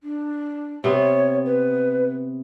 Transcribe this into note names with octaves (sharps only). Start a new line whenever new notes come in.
D4
C3 B3 C#5
B4